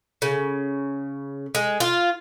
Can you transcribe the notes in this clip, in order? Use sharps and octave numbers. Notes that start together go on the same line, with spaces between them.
C#3
G#3
F4